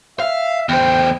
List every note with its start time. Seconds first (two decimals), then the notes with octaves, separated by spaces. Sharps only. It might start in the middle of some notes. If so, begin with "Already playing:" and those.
0.20 E5 F5
0.69 E2 C5 G5